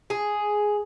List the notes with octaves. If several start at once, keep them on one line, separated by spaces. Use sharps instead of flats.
G#4